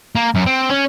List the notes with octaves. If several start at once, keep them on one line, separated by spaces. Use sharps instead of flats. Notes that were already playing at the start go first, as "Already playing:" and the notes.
A#3
F#2
C4
C#4